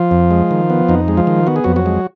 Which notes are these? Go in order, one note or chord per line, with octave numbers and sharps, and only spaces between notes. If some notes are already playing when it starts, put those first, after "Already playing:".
Already playing: F3 F4
F2
G#3
D#3
B3
F2 D#4
G#3
F3 F4
D#3
B3 F#4
G#4
F2 F#3 F#4
F#3 F#4
G#3